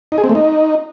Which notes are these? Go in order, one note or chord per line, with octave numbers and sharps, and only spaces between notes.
D#4
G#4
C4
A3
D#4